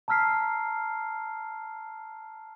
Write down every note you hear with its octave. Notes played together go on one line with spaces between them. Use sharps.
A5 A#5 E6 F6 B6 C7